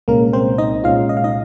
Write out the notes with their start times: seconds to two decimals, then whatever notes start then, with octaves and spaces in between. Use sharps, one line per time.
0.08 C2 A#2 G#3 A#3 C#4 A#4
0.33 C4 C5
0.58 D#4 D#5
0.84 C2 A#2 G#3 C#4 F4 F5
1.09 D#5
1.17 F5
1.24 D#4 D#5